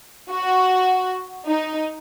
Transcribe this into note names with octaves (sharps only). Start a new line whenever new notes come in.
F#4
D#4